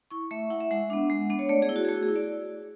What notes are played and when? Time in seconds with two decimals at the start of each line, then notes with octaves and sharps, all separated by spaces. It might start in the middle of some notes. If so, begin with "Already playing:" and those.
0.11 E4 C#6
0.31 A3 E5
0.50 E4 F#5
0.60 E5
0.71 G#3 F#5
0.90 B3 D4
1.10 G#3
1.30 B3 D4
1.39 C#5
1.49 A3 D5
1.62 G#4
1.69 E4
1.76 F#4
1.85 G#4
1.89 A3 F#4
2.03 G#4
2.08 E4
2.16 D5